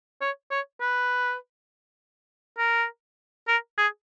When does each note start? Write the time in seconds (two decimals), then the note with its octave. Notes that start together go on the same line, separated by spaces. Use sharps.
0.21 C#5
0.51 C#5
0.81 B4
2.58 A#4
3.48 A#4
3.78 G#4